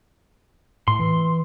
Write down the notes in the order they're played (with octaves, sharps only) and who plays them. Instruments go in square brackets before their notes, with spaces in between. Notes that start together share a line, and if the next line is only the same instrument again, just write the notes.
[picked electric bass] A2 [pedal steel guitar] C6
[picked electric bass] E3